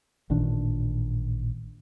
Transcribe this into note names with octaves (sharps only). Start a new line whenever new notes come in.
A1 A#2 D#3 D4